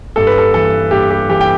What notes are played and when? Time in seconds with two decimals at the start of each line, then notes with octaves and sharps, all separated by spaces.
0.16 G2 A4
0.27 B4
0.38 A4
0.54 E3 A4
0.91 G2 G4
1.11 G4
1.29 E3 G4
1.41 G5